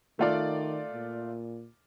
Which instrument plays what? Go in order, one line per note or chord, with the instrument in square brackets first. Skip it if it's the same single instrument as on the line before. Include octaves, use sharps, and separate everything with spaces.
[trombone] D#3 [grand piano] A3 F4 D5
[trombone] A#2